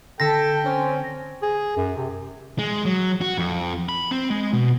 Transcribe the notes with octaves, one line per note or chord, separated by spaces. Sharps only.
D3 A4 G5 A5 A#6 B6
C4 C#4
G#4
F#2
C3
G#3
F#3
F#4
F2
B5
C4
G#3
B2